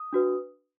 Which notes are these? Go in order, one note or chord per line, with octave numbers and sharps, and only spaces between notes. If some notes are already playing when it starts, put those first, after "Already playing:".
Already playing: D#6
D4 F#4 B4